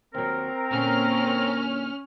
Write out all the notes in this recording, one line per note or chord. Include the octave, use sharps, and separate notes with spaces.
D#2 F#3 C4 A#4
A#2 D3 A#3 C#4 F6